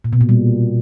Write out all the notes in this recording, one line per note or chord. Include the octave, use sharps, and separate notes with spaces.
A#2
B2
A#2
G3